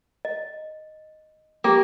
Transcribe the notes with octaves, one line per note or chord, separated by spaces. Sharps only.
D#5
A#3 G4 G5